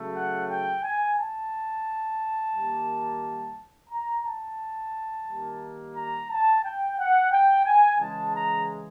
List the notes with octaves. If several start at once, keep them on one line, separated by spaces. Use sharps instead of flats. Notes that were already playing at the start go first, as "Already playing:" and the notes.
Already playing: C#3 F#3 A3
F#5
G5
G#5
A5
D#3 G3 A#3
A#5
A5
D#3 G3 A#3
A#5
A5
G5
F#5
G5
G#5
C#3 E3 G#3 A5
A#5